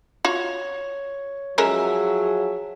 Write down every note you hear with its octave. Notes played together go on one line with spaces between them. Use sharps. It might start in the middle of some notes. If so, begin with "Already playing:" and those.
F4 F#4 C#5
F3 F#3 G#3 C#4 G#4 A#4 E5 E6